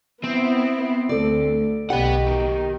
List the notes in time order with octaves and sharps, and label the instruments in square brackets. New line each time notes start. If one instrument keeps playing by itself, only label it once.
[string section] B3 E4 [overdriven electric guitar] C4
[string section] D2 [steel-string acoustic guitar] A4 D5
[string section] B1 B2 [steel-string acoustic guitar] G4 D#5 [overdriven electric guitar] B4 F#5
[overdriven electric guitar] D#3